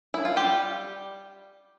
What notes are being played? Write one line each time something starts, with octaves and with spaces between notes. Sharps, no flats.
E4
F4
G3 G4